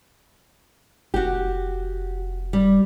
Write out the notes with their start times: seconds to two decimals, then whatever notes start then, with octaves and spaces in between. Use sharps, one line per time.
1.14 F1 F#4 G4
2.53 G3